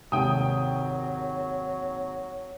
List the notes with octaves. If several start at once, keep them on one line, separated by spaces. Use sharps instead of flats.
G#1 D#2 C3 F#3 G#3 C#5 G5 D#6